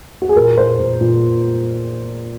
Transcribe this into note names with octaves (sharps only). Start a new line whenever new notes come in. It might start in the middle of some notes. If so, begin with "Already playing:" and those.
F#4
G#4
A#2 A#4
A#2 C5
A#2
A#2